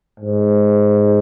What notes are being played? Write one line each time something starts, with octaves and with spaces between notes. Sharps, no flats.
G#2